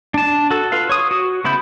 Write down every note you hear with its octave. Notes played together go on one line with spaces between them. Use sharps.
D4 A5
F#4 A4
F4 B4 F5
C#5 D#6
F#4
C#3 B3 E4 B5 G6